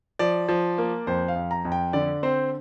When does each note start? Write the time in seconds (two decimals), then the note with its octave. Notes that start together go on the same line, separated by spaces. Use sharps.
0.19 F3 D5
0.49 F3
0.78 A#3
1.07 F2 C5
1.28 F5
1.36 F2
1.51 A#5
1.65 F2
1.72 G5
1.93 D3 D5
2.23 C4 C5